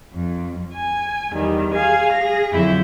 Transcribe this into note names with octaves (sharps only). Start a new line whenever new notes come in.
F2
G#5
E2 D#3 G3
G#4 F5 G#5
G#4 A#6
F2 D3 F#3 E4 E5 G6